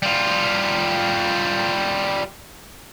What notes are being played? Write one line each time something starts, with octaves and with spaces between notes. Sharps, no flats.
G3 F4